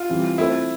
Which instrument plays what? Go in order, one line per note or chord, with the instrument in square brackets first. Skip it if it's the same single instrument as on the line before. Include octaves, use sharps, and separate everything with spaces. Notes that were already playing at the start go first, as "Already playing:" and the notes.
Already playing: [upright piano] F4
[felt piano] E3 G3 C4
[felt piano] A3 C4 F4 A4 C5 [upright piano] E4